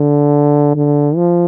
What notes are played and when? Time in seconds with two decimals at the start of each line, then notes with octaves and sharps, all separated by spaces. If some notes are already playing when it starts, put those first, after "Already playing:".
Already playing: D3
0.76 D3
1.16 F3